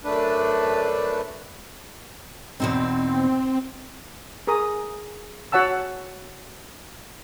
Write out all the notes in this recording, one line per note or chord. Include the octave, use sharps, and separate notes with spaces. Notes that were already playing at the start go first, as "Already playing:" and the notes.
F#2 A3 D4 B4
E2 B2 C4 D#4
G#4 A#4 A#5 D#6
F#4 C#5 F#5 A5 E6